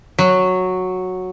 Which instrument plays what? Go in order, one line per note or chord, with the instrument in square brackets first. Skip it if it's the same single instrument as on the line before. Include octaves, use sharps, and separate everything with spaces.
[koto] F#3